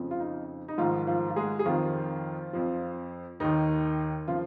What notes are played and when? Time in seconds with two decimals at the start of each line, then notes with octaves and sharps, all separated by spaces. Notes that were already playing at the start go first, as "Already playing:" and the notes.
Already playing: F2 C#3 F3
0.11 F4
0.20 D#4
0.68 D#4
0.78 G#2 D#3 F3 F4
1.07 F3 F4
1.30 F4
1.36 G#3 G#4
1.59 G#4
1.65 F2 D#3 F3 F4
2.53 F2 F3
3.40 D#2 D#3 D#4
4.28 C#3 F3 F4